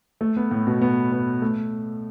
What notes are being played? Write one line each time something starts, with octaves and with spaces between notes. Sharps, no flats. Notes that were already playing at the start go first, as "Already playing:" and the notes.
A3
B3
A2
B2
B3
B3
A3